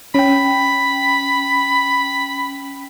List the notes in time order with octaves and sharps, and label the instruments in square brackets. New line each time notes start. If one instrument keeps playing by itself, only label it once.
[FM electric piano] C#4 G5 [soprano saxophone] B5